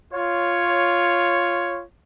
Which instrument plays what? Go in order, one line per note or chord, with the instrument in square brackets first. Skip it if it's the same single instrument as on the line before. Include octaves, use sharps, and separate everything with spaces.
[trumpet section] F4 C#5